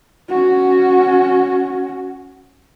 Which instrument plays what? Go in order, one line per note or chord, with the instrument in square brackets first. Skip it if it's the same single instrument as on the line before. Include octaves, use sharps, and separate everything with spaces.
[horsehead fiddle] C#4 F#4